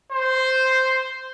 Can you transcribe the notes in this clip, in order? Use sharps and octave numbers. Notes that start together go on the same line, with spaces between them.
C5